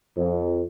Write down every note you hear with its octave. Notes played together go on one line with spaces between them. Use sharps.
F2